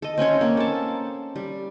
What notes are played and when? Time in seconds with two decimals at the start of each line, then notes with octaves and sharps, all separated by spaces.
0.02 A4 D#5
0.18 C4 C#4 C5 C#5
0.41 A#3
0.57 A4 A5
1.36 G3